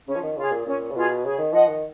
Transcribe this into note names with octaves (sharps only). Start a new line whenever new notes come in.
C#3 C#4
F3
D#3
C#3 F4 G#4
A#2
A#2 C#4
C#3
B2 F4 G#4
C#3 G#4
D#3
F3 D#5 F#5
D#3